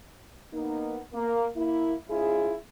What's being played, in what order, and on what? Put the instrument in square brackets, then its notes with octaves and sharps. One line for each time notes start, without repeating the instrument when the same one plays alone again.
[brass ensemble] A#3 B3 D#4
A#3
A#3 E4
G#2 C#4 E4 F4 G#4